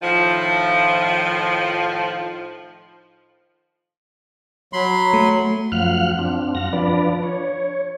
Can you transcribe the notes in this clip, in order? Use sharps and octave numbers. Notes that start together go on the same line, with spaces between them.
A2 D#3 F3
F#3 B5 C6
A3
F#2 F3 F5 F#5 F6 F#6
C4 D4
F#2 F5 F#5 A#6
F3 D4 B4 D5
C#5